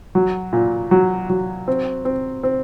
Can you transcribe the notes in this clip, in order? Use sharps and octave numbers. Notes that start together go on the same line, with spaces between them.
F#3
A#2
F#3
F#3
C4
C4
C4